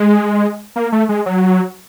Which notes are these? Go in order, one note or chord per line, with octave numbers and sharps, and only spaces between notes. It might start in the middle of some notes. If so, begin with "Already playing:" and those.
Already playing: G#3
A#3
A3
G#3
F#3